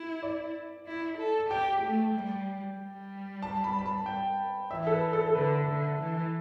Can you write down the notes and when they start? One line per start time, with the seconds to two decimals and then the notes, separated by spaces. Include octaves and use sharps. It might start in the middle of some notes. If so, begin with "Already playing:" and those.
Already playing: E4
0.23 D5
0.86 E4
1.18 A4
1.50 G4 G5
1.82 A3
2.15 G3
2.78 G3
3.43 A5
3.64 B5
3.79 B5
3.86 A5
4.06 G5
4.71 E3 E5
4.87 A4
4.92 B4
5.13 A4
5.27 A4
5.35 D3 B4
5.67 D3
5.99 E3